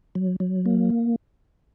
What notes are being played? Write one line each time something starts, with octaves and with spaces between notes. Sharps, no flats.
F#3
F#3
A#3